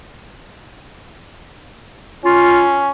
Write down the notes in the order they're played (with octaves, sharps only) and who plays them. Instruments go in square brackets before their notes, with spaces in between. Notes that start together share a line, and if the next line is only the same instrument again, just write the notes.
[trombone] C#4 [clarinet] F4